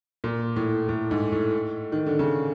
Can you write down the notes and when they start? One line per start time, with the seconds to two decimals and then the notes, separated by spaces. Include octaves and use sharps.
0.24 A#2
0.56 A2
0.89 A2
1.11 G#2
1.32 A2
1.92 D#3
2.06 D3
2.19 C#3